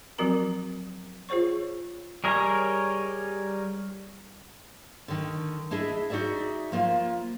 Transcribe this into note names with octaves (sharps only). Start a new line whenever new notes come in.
F3 F#3 C4 F#4 A#4 A#5
F4 G#4 C5 C#5 C#6
G3 G#4 A#4 C#5 D#5
D3 D#3
D4 E4 G#4 D#5 E5
D#4 F#4 G#4 D5 E5
F3 A#3 F4